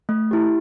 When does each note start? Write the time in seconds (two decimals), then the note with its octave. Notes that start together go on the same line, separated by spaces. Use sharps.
0.09 A3
0.31 E4 G4